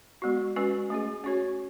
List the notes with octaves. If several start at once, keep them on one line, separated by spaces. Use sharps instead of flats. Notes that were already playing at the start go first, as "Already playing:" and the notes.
G#3 B3 F#4
G#3 C#4 F#4 B4
A3 C#4 G#4
C#4 F#4 C#5